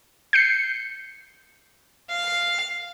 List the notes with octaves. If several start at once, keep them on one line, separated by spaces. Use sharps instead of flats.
G6 C7 C#7
F5